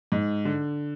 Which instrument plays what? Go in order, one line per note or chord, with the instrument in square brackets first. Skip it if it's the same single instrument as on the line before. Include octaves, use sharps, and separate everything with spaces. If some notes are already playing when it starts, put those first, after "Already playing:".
[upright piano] G#2
D3